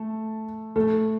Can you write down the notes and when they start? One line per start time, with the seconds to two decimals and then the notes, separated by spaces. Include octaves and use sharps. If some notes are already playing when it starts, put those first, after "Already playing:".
Already playing: A3 A4
0.76 A3 A4